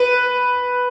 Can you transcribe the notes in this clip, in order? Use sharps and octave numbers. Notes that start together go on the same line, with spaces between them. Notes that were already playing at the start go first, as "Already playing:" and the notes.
Already playing: B4